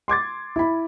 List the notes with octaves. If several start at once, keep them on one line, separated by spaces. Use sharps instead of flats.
C6 D6 G#6 A6
E4 B5